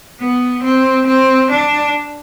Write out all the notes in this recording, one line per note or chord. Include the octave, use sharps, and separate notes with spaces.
B3
C4
C4
D4